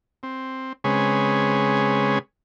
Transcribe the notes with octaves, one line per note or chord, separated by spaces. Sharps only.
C4
C#3 G#3 C4 G#4 B4 C#5